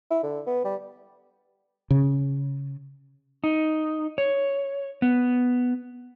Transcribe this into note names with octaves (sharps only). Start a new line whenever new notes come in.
E4
D3
B3
G3
C#3
D#4
C#5
B3